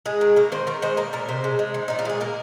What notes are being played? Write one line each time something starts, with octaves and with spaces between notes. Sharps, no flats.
G#3 G#4
D#3
A#3 A#4
D#3 C5
D#3 A#4
G#3 C5
A#3 A#4
A#2 A#4
C3 C5
G#3
G#3
D#3
A#2 D#4
F4
G#3 G#4
A#3 A#4